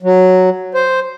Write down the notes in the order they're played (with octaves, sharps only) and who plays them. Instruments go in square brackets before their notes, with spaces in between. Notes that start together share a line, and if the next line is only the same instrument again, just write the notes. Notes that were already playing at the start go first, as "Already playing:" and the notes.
[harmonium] F#3
C5